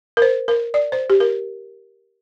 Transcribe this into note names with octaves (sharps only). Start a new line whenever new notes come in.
A#4
C5
A#4
D5
C5
G4
A#4